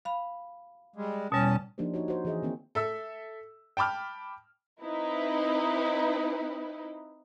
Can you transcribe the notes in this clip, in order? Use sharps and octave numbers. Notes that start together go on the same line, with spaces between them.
F5 B5
G3 G#3
E2 B2 G3 C#4 A5
F3 A#3 D4 D#4 G4 C5
D#4 F#4 C#5
F#4 C5
E3 F#4 G#4 D#5 E5
D#3 A#3 C4
A4 E5 E6
G5 A5 B5 D6 F6
C4 D#4 E4 B4